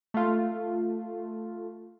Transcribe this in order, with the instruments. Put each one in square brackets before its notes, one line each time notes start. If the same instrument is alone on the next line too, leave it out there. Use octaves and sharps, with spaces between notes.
[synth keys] A3 F4